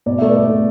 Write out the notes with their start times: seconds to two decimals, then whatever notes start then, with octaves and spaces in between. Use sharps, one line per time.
0.06 B2 D5
0.18 A3 E5
0.29 B4 D5
0.35 A3
0.50 B2